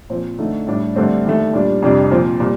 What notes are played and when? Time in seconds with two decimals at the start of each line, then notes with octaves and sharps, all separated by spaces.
0.10 A#2 F3 C4
0.38 D3 A3 D#4
0.67 A2 G3 D4 G4
0.96 G2 D3 A3 C4
1.24 D#2 D#3 A3
1.53 A#2 G3 D4
1.82 F2 C3 G3 D4
2.11 A#2 F3 C4
2.40 A#2 G3